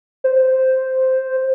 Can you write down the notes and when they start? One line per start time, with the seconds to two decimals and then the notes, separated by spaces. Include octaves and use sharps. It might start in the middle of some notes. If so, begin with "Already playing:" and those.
0.24 C5